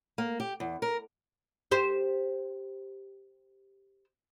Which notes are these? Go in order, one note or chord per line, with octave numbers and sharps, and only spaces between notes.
A#3
G4
E2
A#4
G4 C5